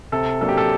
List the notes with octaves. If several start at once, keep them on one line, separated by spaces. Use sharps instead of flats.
C3 A4
F#3 A#3 D4 A4
G4
A4